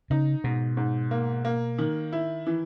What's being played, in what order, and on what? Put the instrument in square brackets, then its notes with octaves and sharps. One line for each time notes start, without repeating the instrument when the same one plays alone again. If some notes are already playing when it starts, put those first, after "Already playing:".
[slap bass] C#3 [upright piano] D#4
[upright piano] G#2 [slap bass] B2
[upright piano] G#2
A#3
A#3
D#3
E4
E3